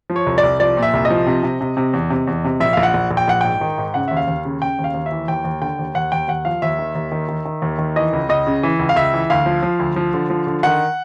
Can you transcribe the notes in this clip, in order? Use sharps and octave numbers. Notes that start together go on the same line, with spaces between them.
F3
C#5
C2
D5
C2
F3 D5
A#2
E5
C2
D#5
F3
C3
C3
C3
C3
E2
C3
E2
C3
A#1 E5
A#1 F5
F#5
A#1
A#1
G5
A#1 F#5
G#2 G5
D#3
G#2
C#3 F#5
D#2 E5
F5
D#2
C#3
C#3 G5
D#2
F5
D#2
E5
E3
D#2 G5
D#2
D3 G5
D#2
D#2 F#5
D#2 G5
D#2 F#5
F3 F5
D#2 E5
D#3
D#2
D#3
D#3
D#3
D#2
D#3
E3 D#5
C#2
C#2 D#5
C#3
E3
C#2
F5
C#2 E5
E3
D2 F5
F3
F3
D2
F3
D3
F3
D3
D#3 F#5